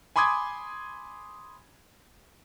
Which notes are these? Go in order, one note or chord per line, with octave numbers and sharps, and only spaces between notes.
G#5 B5 C6 D6 D#6 G#6